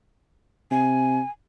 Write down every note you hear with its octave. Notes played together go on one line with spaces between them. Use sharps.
C3 G#5